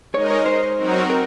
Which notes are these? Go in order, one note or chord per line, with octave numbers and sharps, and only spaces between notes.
G#3 D#4 A#4 C#5 D#5
C#5
C5
F#3 C4 D#4 F#4 A#4
A#4